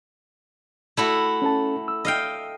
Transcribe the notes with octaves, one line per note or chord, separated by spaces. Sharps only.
A3 E4 F#4
C#4 A4 A5
E6
D#5 F5 G5